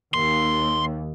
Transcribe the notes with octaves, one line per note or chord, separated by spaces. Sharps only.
D#2 C6